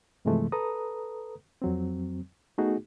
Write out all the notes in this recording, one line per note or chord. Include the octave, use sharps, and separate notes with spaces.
G2 C3 E3 F3 G#3 A3
A4 B4 A#5 D#6
F2 F#3 C4
A3 B3 D#4 F#4 G#4